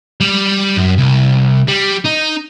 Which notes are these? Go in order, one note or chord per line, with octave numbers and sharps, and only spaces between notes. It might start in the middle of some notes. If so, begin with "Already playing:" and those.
G3
F#2
C2
G3
D#4